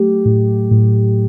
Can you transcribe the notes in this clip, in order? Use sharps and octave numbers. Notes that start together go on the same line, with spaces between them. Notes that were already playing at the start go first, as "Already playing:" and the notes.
Already playing: F#3 A3 G4
A2
A2